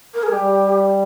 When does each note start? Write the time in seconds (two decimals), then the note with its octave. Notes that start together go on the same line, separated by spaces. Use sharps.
0.14 A#4
0.23 G#4
0.31 G3 G4